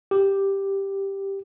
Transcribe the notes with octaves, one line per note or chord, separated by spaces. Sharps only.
G4